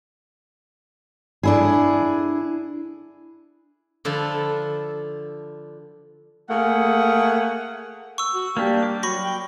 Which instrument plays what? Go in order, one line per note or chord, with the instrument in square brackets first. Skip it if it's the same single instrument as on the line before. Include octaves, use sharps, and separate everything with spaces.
[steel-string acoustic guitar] D4 E4 G#4
[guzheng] D3 F3 E4 A4
[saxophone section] A3 A#3 G#4 F#5
[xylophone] C#6 E6
[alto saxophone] F#4
[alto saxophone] G3 [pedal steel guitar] A#3 D4 G4
[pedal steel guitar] D6
[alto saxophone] F#3 [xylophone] B5 C#6 A#6
[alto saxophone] G5